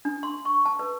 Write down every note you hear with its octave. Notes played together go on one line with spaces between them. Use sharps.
D4
C6
C#6
A5
B4